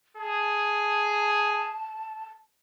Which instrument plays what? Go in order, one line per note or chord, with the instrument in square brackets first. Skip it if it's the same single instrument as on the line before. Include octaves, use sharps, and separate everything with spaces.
[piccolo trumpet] G#4 [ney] A5